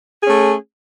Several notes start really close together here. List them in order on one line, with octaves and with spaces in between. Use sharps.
G#4 C#4 A3